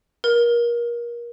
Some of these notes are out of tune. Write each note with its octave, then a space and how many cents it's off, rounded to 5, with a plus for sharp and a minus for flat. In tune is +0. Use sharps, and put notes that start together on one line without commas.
A#4 +30